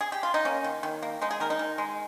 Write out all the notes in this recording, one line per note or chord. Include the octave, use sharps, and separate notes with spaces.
G#4
G4
F4
D#4
A#3 C#4
D#3
D#3
A#3
G#3 D#4
G#4
D#3 A#4
D#4
D#3
G#3